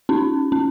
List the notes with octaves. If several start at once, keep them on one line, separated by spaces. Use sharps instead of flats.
C#4 D#4
C#4